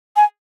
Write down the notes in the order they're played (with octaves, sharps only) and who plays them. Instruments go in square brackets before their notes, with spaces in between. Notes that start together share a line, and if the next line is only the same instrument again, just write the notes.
[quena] G#5